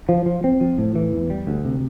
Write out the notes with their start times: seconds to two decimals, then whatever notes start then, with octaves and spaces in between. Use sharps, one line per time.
0.09 F3
0.26 F3
0.44 C4
0.61 F3
0.78 A2
0.95 E3
1.13 E2
1.30 G3
1.47 D2
1.65 C3